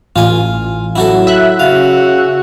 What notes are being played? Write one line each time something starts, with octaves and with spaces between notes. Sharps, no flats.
A1 F4 G#5
F#3 E4 F#4 A4
E5 F#6
C#3 F#4 F5